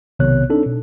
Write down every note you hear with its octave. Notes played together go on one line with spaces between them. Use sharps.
B1 C3 D#3 B3 C#5 F#6
C4 D4 D#4 A4
B2